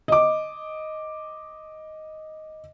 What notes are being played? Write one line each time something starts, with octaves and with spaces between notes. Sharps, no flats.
D#5 D6